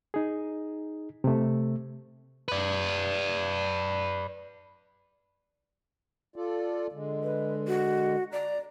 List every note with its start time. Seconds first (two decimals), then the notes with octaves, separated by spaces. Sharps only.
0.14 D#4 G#4
1.24 C3 A3
2.48 B4 D5
6.36 F4 A4 D5
6.93 D3 G#3
7.23 B4
7.67 F#4
8.32 D5 A#5